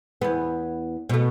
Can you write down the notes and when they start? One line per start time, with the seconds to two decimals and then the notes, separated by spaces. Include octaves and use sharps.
0.22 E2 B3
1.09 B2 A3